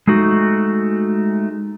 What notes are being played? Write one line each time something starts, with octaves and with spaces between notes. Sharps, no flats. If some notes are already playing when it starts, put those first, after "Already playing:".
G#3 A3 D#4 F#4